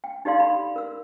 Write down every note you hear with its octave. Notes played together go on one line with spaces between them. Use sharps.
G5
D#4 G4 A4 D5 F5 C6
B5
A#4 E6